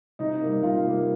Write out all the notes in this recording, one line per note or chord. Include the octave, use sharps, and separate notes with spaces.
C3 D#4 D#5
G3 A#3
C3 F4 F5
G3 A#3